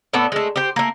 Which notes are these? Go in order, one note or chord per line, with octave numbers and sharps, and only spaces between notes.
A2 B3 A4 D5
G#3 A3
G4 C5
A3 A#3